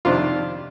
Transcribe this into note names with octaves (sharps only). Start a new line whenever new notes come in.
F2 C3 D#3 D4 F4